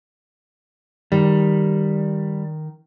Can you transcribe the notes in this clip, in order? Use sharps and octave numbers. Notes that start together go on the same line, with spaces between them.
D#3 G3